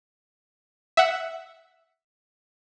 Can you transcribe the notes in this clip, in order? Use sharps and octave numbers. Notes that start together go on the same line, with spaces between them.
E5 F#5